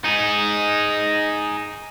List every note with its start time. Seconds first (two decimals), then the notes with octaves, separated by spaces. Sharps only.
0.04 D#4 G#4